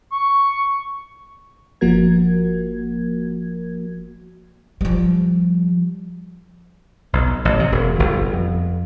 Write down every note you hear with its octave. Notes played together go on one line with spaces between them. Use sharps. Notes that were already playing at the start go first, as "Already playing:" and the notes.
C#6
G1 F3 A#3 F#4 A#4 G#6
F3 G3
B1
A1
C3
E1
G1
F2